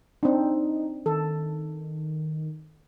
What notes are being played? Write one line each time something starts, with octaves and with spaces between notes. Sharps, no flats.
C4 D4 D#4
D#3 A4